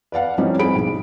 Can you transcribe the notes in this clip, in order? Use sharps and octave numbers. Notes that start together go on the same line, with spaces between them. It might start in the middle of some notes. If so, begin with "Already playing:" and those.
B4 D5 F5 F#5
E3 F3 G3 C4 C#4 D#4
C4 G#4 B5 D7
B1